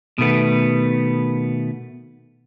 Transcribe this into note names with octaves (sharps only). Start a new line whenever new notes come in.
B2 D#3 A3 B3